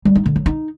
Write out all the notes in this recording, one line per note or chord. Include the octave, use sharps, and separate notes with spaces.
G3
D#4
D3
F#3
D#4